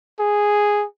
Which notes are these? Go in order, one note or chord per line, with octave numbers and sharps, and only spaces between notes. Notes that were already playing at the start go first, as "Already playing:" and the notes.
G#4